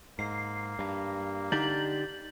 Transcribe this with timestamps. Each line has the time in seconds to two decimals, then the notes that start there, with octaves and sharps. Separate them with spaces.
0.19 G#2 A#3 C7
0.79 G2
1.52 D3 D4 D#4 G4 G6 A6 F#7